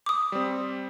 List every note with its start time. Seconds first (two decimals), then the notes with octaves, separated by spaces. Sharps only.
0.06 D6 D#6
0.32 G3 C4